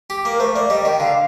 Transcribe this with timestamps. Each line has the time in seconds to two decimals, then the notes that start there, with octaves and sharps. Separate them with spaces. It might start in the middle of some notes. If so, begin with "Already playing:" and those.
0.10 G4
0.25 A#3
0.31 A#4
0.40 A3 C5
0.55 A#3 D5
0.70 G3 D#5
0.85 D#3 G5
1.00 D3 F5